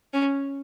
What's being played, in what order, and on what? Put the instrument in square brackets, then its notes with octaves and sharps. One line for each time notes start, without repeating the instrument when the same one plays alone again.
[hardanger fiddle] C#4